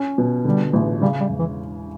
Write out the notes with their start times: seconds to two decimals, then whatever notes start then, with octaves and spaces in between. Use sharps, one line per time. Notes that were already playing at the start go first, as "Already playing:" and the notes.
Already playing: C#4
0.18 B2
0.45 D3 G3
0.73 A1
1.01 C#3 G3
1.20 G3
1.30 E1
1.39 E3